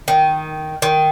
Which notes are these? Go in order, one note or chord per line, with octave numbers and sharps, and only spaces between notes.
D#3
D#3